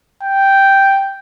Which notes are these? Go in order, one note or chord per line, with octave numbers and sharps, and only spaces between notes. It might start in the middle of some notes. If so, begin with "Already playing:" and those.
G5